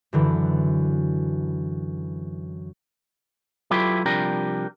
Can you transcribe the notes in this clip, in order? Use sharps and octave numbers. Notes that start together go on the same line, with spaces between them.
F#2 D3 E3
F#3 E4 F4 G4 A4 B4
C3 F3 G3 D4 G4 A#4